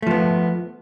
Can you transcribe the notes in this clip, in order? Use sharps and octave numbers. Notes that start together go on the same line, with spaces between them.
F3 A3 B3